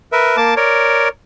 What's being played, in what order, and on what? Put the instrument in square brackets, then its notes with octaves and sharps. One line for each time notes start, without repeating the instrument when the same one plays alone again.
[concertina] A#4 B4 E5
A#3 A5 D6
A#4 C#5 D5